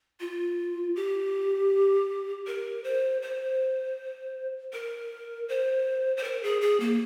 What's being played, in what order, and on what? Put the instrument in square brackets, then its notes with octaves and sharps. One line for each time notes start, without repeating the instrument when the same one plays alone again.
[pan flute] F4
G4
A#4
C5
C5
A#4
C5
C5
A#4
G#4
G#4
A#3